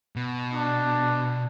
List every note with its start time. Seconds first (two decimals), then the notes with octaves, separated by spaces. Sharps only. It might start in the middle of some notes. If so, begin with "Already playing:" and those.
0.16 B2
0.54 D4